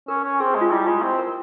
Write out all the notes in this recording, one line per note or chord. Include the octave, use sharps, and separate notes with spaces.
C#4 A#4
C#4
C4 G#4
G4
G#3
F4
G3 E4
G#3 F4
C4 G4
A#4